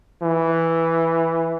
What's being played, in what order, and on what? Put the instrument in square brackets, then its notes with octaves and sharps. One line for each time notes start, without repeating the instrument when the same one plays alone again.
[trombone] E3